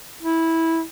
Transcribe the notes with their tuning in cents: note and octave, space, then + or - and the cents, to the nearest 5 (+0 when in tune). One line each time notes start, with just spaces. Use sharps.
E4 -15